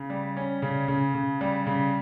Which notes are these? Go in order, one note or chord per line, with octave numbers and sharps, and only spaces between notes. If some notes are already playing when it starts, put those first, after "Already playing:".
Already playing: C#3
G3
C#4
C#3
C#3
C#3
G3
C#3